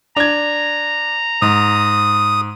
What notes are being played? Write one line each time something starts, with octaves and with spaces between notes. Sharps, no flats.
D4 A#5 G#6
G#2 D#6